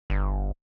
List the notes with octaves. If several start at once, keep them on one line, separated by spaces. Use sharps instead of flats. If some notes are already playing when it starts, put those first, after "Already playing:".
G1